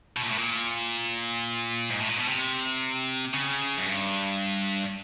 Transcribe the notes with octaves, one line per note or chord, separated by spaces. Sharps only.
B2
A#2
A2
A#2
G#2
A2
A#2
B2
C3
C#3
F#2
G2